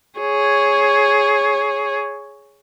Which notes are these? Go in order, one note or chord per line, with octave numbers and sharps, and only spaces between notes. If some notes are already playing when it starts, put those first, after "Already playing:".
G#4 C#5